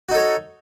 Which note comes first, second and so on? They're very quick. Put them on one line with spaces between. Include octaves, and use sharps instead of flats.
F#4 D#4 A4 C#5